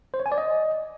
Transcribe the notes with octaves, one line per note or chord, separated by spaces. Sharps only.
C5
C#5
G#5
D5
D#5